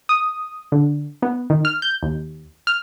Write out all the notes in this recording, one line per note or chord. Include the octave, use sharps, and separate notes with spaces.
D#6
D3
B3
D#3
F6
G6
D#2
F6